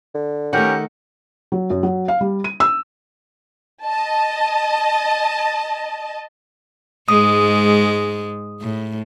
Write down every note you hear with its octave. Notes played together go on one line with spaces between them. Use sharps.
D3
D#3 A3 C#4 G4 A#4 F#5
F#3
F#2
F#3
F5
G3
D#7
E6
D#5 A5
G#2 G#3 D#6
A2